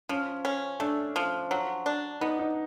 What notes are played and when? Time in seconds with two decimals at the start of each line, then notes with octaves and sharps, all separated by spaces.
0.09 F3 C#4
0.45 C#4
0.80 A3 D4
1.16 F3
1.51 F#3
1.86 D4
2.21 B3 D#4
2.39 D#4